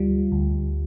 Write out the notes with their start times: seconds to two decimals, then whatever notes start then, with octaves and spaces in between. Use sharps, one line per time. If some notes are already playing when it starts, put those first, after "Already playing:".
Already playing: D2 G3 F4
0.32 D2